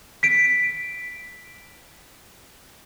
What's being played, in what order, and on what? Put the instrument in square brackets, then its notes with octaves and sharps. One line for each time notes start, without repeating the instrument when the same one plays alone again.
[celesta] B6 D7